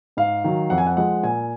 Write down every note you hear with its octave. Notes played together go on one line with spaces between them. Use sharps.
G#2 F5
D#3 F#3
F2 F#5
G#5
F#5
F3 G#3 F#5
A#2 G#5